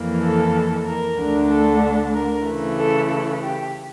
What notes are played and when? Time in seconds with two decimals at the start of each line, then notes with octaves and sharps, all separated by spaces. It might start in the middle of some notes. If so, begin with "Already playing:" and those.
Already playing: F2 E3 A#3
0.21 A4
0.85 A#4
1.17 D2 D3 A3 D4
1.49 A4
2.14 A#4
2.45 C#3 E3 A3
2.77 A4
3.09 A4
3.42 G4